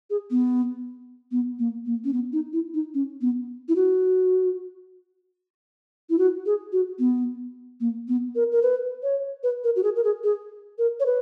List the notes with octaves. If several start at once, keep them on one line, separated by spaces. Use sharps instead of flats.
G#4
B3
B3
A#3
A#3
C#4
B3
D#4
E4
D#4
C#4
B3
E4
F#4
E4
F#4
G#4
F#4
B3
A#3
B3
A#4
A#4
B4
C#5
B4
A#4
F#4
G#4
A#4
G#4
G#4
A#4
C#5
B4